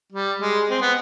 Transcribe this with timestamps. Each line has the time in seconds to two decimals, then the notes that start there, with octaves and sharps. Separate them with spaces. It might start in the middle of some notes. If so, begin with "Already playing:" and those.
0.12 G3
0.41 G#3
0.70 C4
0.81 B3